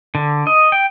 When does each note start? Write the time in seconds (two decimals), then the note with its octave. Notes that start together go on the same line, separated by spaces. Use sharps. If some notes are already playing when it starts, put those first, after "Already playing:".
0.15 D3
0.47 D#5
0.72 G5